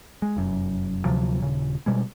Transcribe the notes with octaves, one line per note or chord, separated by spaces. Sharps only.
G#3
F1 F#2
D2 C3 F3 F#3
D#1 C#3
B2 G3 G#3